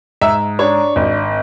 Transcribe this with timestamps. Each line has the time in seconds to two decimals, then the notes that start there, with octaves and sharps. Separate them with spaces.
0.21 G#2 E5
0.59 D4 C#5
0.96 G#1